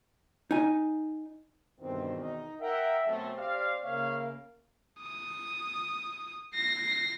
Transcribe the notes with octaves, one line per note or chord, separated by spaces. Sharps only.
D#4 G#5
E2 G2 B2 D#3 C4
D#4
A#4 E5 F#5 G5
F#2 B2 A3 C4
G4 D5 F5
C#3 A#3 C#5 E5 F5
D#6
A#6 C7